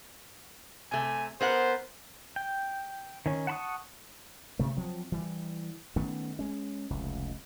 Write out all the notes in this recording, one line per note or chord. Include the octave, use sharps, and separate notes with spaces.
C3 A3 G#5
B3 A#4 C5 F#5
G5
D#3 C#4
F#5 A5 B5 C#6 D#6
G2 C3 A3
F3 F#3 C4
E3 G3
D#3 A3 B3 C#4
G#3 C#4
F1 C#2